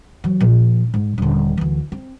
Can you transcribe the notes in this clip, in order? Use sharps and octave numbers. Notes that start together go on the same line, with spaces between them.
E3 F#3
A#2 F3
G#2
D#1 D3
D2 E3
C4